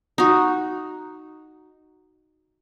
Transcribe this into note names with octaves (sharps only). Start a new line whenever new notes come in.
D#4 F#4